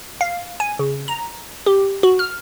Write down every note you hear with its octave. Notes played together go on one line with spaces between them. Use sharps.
F5
G#5
C#3
A#5
G4
F#4
F6